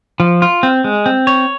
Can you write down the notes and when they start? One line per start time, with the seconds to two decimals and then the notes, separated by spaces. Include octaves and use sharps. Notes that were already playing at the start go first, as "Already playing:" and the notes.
0.20 F3
0.42 F4
0.63 C4
0.84 G#3
1.06 C4
1.27 C#5